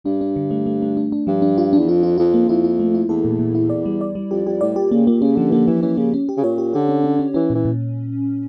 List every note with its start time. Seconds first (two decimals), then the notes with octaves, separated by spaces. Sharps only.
0.05 G2 D4
0.21 D4
0.36 D3
0.51 A3
0.66 A3
0.82 A3
0.97 D4
1.12 D4
1.27 G2 F3
1.42 D4
1.58 F4
1.73 D4
1.78 E2
1.88 F2 F4
2.03 F4
2.18 F2 F4
2.34 A#3
2.49 F2 E4
2.64 E4
2.80 A3
2.95 E4
3.09 E2 A4
3.25 A#2
3.39 A#2
3.55 E4
3.70 D5
3.85 G3
4.01 D5
4.15 G3
4.31 F2 G4
4.46 F2 G4
4.61 A2 D5
4.76 A#2 G4
4.91 C#3 A#3
5.07 A#2 A#3
5.21 C#3 C#4
5.36 D3 F3
5.49 E3
5.52 D3 A#3
5.67 E3 F3
5.82 E3 C#4
5.97 C#3 A#3
6.14 C#4
6.29 G4
6.37 C#3
6.43 A#2 C#5
6.58 G4
6.73 D3 G4
6.89 C#4
7.04 C#4
7.19 C#4
7.34 E3 C#4
7.50 A#2 E3
7.65 A#2